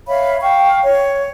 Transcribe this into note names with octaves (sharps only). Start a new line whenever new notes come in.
C#5 E5 F5 B5
F5 G5 C#6
C#5